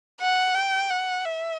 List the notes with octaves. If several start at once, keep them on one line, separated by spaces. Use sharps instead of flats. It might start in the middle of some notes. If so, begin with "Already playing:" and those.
F#5
G5
F#5
E5